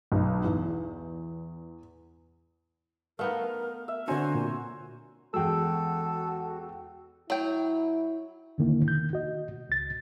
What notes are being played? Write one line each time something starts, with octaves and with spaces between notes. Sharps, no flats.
B1
E2
A3 B3 D#4 A#4 F5
E5
D3 C4 D4 F#4 C5 C#5 G#5 A#5
A#2
E2 G#3 F#4 A4 G5 E6
F#3 E4 G5
E2 D3 D#3 A#3 E4
D#3 G6
F#4 D#5
C#2 A6